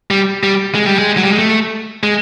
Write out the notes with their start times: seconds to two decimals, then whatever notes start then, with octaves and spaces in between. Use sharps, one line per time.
0.11 G3
0.43 G3
0.75 G#3
0.86 G3
0.99 G#3
1.17 F#3
1.24 G3
1.32 G#3
1.39 A3
2.03 G#3